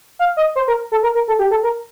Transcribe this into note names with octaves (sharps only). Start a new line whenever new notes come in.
F5
D#5
C5
A#4
A4
A#4
A#4
A4
G4
A4
A#4